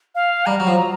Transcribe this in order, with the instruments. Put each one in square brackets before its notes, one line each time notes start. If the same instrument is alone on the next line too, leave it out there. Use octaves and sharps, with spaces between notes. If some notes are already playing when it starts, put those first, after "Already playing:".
[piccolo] F5
[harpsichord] G3 [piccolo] A#5
[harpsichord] F#3
F3